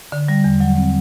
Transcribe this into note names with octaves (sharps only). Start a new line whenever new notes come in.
D3
G3
E2
F#3
C4